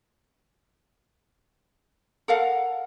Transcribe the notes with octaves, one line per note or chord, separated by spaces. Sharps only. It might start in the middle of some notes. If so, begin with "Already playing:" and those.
A4 A#4 F5 F#5